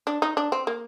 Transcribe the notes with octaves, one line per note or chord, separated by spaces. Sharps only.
D4
D#4
D4
C4
A#3